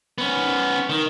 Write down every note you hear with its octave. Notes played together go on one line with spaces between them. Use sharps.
B3 C#4
D#3